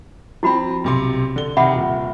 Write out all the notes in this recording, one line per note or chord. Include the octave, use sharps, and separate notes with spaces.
F3 C4 E4 F#4 B5
B1 C3 C6
D3 G7
C3 D#3 E5 F#5 B5
D#1